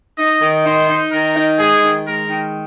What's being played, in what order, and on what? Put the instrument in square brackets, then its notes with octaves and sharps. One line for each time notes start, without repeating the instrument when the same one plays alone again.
[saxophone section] D#4 [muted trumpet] D#5
[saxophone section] D#3
[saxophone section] D#4 [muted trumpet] C5
[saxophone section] D#4
[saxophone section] D#3 [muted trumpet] A#4
[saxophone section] D#4
[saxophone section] G#3 [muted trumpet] G#4
[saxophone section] D#3
[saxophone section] G#3 [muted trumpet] A#4
[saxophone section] D#3